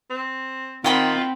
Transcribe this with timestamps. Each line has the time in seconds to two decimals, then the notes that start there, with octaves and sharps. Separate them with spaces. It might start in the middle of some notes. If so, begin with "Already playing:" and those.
0.10 C4
0.84 D#3 C4 F4 F#5 G5 B5